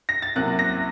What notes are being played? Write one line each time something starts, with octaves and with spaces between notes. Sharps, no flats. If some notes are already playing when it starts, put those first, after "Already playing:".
A#6
A6
C2 C3 F#3 A#3 C#4 F#6
A#6